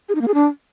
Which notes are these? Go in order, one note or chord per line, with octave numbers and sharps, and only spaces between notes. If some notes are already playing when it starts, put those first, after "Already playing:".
G#4
D#4
A#3
G#4
D4